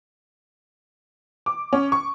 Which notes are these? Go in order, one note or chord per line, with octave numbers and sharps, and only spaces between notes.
D6
C#4
C#6